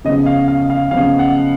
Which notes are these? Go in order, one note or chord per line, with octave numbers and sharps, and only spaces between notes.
C#3 F3 B3 D#5
F5
F5
F5
C#3 F3 B3 F5
F#5